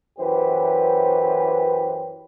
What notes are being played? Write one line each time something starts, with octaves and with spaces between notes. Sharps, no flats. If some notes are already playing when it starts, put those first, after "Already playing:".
F#2 E3 G4 B4 C5